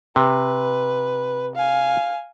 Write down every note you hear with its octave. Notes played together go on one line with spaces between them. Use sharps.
C3 B4
F5 G#5